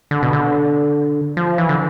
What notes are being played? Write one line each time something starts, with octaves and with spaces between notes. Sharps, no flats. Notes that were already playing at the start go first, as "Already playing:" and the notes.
D3
B2
D3
F3
E3
D3